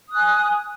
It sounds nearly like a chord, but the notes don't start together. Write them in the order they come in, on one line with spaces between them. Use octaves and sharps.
D#6 F#6 G#5